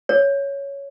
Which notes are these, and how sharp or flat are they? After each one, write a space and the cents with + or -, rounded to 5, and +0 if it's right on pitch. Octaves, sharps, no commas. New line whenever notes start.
C#5 +5